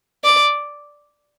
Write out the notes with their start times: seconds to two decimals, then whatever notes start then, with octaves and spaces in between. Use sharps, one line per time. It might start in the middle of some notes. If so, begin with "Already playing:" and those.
0.24 D5